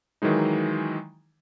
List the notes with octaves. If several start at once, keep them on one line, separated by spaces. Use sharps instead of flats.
D#3 E3 F#3 G#3 D#4